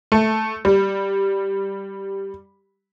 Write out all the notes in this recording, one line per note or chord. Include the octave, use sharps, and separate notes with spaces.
A3
G3